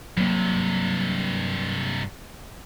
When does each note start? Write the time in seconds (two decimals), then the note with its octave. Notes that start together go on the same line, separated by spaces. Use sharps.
0.17 G2 C3 F#3 A#3